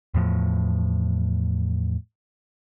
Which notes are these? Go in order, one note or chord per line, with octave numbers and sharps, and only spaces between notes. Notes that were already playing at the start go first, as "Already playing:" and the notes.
E2 A2 F3